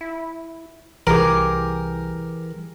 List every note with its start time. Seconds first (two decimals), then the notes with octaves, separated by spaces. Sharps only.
0.01 E4
1.07 C2 E3 G4 G#4 A#4 D6